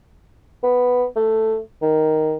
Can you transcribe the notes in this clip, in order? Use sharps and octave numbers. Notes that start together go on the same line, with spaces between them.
B3
A3
D#3